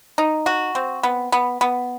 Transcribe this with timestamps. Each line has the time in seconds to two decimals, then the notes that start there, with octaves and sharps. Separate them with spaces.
0.18 D#4
0.46 F#4
0.75 C4
1.03 B3
1.32 B3
1.61 B3